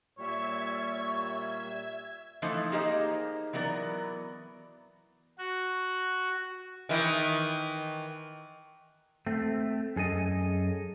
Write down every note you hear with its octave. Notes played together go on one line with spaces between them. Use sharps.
A#2 G3 C#5 E5 G#6
E3 F3 A3 D#4 A4 C5
A#3 D#4 G4 G#4 C5 D#5
E3 F#3 B3 A#4 D5
F#4
D#3 E3 E4
A3 C4
F#2 G#4 A4 D#5 G#5